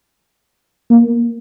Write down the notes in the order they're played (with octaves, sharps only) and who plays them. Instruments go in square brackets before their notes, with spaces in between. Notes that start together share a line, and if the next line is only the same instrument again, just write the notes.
[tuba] A#3